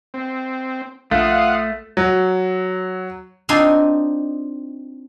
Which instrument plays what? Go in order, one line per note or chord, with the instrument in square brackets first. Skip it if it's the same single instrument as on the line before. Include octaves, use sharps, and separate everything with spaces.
[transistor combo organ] C4
[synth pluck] A#1 [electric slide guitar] A3 [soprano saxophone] F4 [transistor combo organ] F5 F#5 D#6
[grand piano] F#3
[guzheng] C4 D4 D#4 F4 G#5 C6